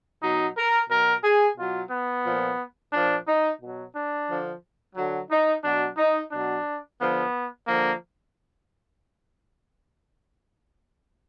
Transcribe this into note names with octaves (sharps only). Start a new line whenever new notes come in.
B2 F#3 D#4
A#4
B2 F#3 A#4
G#4
B2 F#3 F4
B3
A#2 F3
A#2 F3 D4
D#4
B2 F#3
D4
D3 F3
D3 F#3
D#4
B2 F#3 D4
D#4
B2 F#3 D4
D3 F3 B3
D3 F3 A#3